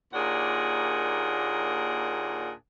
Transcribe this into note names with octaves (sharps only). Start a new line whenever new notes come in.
D#2 A#2 D4 G#4 F#5